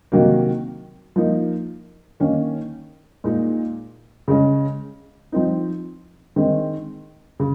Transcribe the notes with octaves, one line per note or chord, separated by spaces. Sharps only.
C3 D#3 F#3 A#3
F3 A#3 D#4
D#3 A#3 C#4
A#2 G#3 D#4
C#3 G#3 C#4
F3 C4 D#4
D#3 G#3 C4
C#3